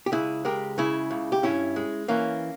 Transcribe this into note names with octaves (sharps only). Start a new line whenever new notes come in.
G4
C#2 E4 G#4
G#3 G4 A#4
C#3 E4 G#4
C#2
G4
G2 C#4 E4
G#3
E3 A#3 C#4